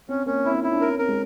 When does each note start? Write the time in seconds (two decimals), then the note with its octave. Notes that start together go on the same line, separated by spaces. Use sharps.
0.09 C4 C#4
0.26 A#3 C#4
0.45 C4 E4
0.54 C#4
0.63 D#4 E4
0.72 D4
0.81 C4 A#4
0.90 C#4
0.99 C4 A#4
1.09 G#3